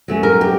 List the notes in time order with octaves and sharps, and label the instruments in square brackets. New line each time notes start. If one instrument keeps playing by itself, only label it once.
[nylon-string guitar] F#3 A3 C#4
A#4
G4